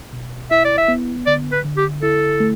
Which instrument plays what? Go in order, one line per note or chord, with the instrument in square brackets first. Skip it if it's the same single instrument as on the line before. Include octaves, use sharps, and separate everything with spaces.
[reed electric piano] B2
[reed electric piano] E4 [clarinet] E5
[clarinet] D5
E5
[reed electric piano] B3
[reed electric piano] D3 [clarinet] D5
[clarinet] B4
[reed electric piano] D3
[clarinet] G4
[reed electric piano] E4 [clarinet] A4
[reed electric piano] A3